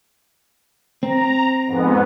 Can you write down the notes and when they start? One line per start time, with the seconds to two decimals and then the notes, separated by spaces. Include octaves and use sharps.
1.03 C4 A#5
1.67 F2 G#2 B3